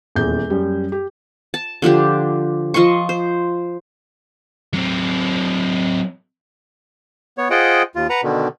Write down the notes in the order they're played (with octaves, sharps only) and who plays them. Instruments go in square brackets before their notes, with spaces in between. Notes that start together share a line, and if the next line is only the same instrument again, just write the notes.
[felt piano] D#1 E2 G6
F#2 G3
G4
[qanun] A5
D3 F3 D4 G4
F3 D#5 C6 C#6
C5
[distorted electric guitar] F#3 C4
[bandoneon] B3 C#5
F4 G#4 C5 D#5 F#5 G5
D#2 F4
B4 F#5 A#5
B2 D3 D#3